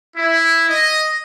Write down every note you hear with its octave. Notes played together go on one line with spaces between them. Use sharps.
E4
D#5